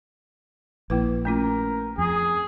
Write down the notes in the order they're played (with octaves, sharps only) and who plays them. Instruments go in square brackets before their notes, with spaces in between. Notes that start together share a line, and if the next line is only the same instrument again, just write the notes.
[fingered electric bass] A#1 [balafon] A#3 E4 B4
[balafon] A3 C#4 F4 [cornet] A#4
[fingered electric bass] F2 [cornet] G#4